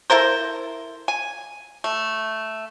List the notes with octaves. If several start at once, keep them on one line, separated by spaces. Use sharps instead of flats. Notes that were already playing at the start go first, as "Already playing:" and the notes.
E4 A4 A#4 C5
G#5
A3